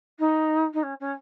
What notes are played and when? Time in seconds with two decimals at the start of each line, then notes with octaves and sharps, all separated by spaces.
0.19 D#4
0.73 D#4
0.83 C#4
1.00 C#4